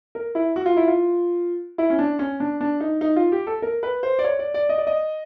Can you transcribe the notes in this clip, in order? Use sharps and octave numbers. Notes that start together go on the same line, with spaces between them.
A#4
E4
F#4
F4
E4
F4
E4
C#4
D4
C#4
D4
D4
D#4
D#4
F4
G4
A4
A#4
B4
C5
D5
C#5
D5
D5
D#5
D5
D#5